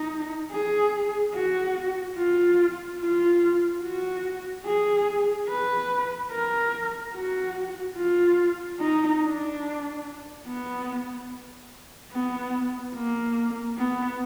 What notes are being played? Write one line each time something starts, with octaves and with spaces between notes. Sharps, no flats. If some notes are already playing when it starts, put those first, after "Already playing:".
Already playing: D#4
G#4
F#4
F4
F4
F#4
G#4
B4
A#4
F#4
F4
D#4
D4
B3
B3
A#3
B3